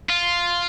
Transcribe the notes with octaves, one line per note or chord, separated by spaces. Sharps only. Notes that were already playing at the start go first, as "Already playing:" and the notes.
F4